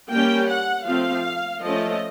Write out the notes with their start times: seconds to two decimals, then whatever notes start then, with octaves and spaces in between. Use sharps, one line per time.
0.10 G3 A#3 C#4 G5
0.48 F#5
0.86 F3 A3 C4 F5
1.63 F3 A3 C#4 D#5